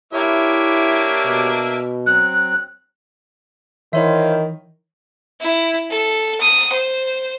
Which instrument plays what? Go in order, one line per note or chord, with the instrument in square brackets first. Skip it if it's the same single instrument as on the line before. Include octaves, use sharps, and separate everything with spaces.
[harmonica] A#3 D4 E5 [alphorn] E4 [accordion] G4 C#5
[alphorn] B2
[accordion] F#3 C4 [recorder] F#6
[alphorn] D#3 [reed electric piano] E3 [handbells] E4 C#5 E5 [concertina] F4 C5
[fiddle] E4
A4
D#6
C5